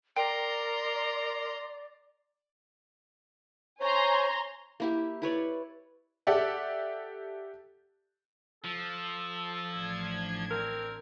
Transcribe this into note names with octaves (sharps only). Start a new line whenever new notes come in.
A#4 D5 G5 A#5 C6
C5 C#5 G#5 A#5 C6
A#3 E4 G4
E4 B4 C#5 D5
G4 A4 D5 E5 F#5
F3 A4
A1 D4 G#6
C4 A#4